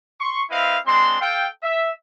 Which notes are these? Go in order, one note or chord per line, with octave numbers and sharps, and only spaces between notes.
C6 C#6
C4 E4 B4 D#5 F5
G#3 C4 D4 C6
A4 F5 G5
E5